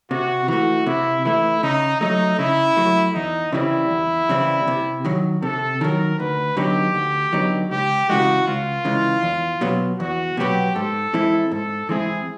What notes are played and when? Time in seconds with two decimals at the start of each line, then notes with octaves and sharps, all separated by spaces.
0.11 C3 F#4
0.48 E3 A3 F#4
0.86 C3 E4
1.25 E3 A3 E4
1.63 C#3 D#4
2.01 F#3 A3 D#4
2.39 C#3 E4
2.77 F#3 A3
3.14 E2 D#4
3.53 C#3 E3 G3 C4 E4
3.91 E2
4.29 C#3 E3 G3 C4
4.68 C3
5.05 D#3 F#3
5.42 C3 A4
5.81 D#3 F#3 A#4
6.19 D2 B4
6.57 D3 F#3 B3 D#4 G4
6.95 D2
7.33 D3 F#3 B3 D#4
7.71 C#2 G4
8.09 C#3 E3 G#3 F#4
8.47 C#2 F4
8.85 C#3 E3 G#3
9.23 E2
9.61 B2 F#3 B3
9.99 E2 F#4
10.37 B2 F#3 B3 G4
10.75 G#2 A4
11.14 E3 G#3 C4 E4
11.51 G#2 A4
11.89 E3 G#3 C4 E4 G#4